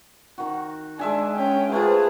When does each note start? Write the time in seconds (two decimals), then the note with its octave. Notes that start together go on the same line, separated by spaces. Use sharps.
0.38 D#3 F#4
0.99 G#3 D4 E5 G#5
1.36 C#4 G5
1.72 A3 F4 G#4 B4 C5